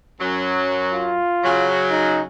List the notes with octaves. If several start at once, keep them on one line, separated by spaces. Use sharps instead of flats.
F#2 F#3
F4
C#3 F#3
D#4